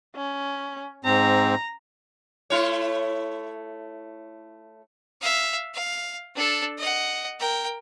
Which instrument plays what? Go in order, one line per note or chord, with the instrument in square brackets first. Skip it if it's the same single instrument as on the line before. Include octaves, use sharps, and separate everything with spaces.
[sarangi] C#4
[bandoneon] G#2 C4 [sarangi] A#5
[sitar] A3 E4 C#5
[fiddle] E5 F5
F5
D4 A4
D#5 F#5
A#4 G5